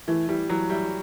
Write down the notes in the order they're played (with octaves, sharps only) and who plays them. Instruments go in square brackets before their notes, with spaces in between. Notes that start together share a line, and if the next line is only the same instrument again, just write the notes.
[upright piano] E3 [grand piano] A3
[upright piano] E3 [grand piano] G3
[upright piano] E3 [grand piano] F#3
[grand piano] G3 [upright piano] E4